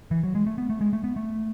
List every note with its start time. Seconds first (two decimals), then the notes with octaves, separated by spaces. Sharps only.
0.11 E3
0.23 F#3
0.35 G#3
0.46 A3
0.58 B3
0.70 A3
0.81 G#3
0.93 A3
1.04 B3
1.16 A3